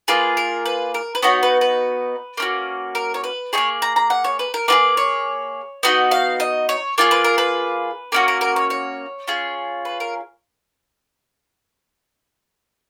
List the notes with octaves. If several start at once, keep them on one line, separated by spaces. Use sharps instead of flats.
A#3 F4 G#4 B4
A#4
B4
A#4
B4
B3 D#4 F#4 C#5
B4
B4
A#3 C#4 F#4
A#4
C#5
B4
A#3 D#4 G#4 C#5
A#5
A#5
F#5
C#5
B4
A#4
A#3 F4 G#4 B4
C#5
B3 D#4 F#4 D#5
F5
D#5
C#5
A#3 F4 G#4 C#5
B4
A#4
B4
A#3 C#4 F#4 A#4
A#4
A#4
C#5
C#5
C#4 F4 G#4
B4
A#4